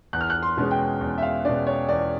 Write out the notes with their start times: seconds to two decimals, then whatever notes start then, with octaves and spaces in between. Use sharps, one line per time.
0.13 E2 F#6
0.21 F6
0.30 F#6
0.43 C6
0.57 B2 G#3 C#4
0.71 G5
1.01 E2
1.18 E5
1.23 F5
1.45 B2 G#3 C#4 D5
1.67 C#5
1.89 E2 D5